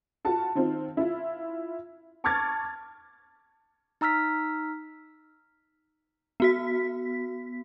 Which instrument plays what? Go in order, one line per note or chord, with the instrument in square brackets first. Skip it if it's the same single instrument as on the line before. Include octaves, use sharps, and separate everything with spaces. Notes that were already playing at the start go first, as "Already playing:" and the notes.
[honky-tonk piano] F4 F#4 A5
D#3 C4 F4
E4 F4
A5 C#6 D6 F6 G#6 A6
[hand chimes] D#4 A#5 E6 F6 B6
[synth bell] B3 F#4 B6